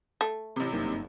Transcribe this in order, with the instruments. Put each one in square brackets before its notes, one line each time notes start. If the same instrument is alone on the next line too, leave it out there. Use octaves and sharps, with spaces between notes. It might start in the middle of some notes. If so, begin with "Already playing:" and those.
[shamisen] A3
[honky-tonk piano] A1 C3
[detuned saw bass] F#1 [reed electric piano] G2 A#3 D#4